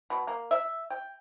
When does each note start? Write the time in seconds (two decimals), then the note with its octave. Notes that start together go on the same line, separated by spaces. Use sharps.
0.10 B2
0.27 A#3
0.51 E5
0.90 G5